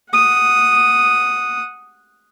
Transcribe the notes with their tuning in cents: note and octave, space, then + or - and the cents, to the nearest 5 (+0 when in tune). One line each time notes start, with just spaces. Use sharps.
F#5 -5 D#6 +0